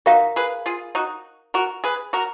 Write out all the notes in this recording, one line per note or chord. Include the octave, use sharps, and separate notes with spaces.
D#4 F#4 A#4 F5 A#5
G#4 B4
F4 G#4
D#4 F#4
F#4 A#4
G#4 B4
F#4 A#4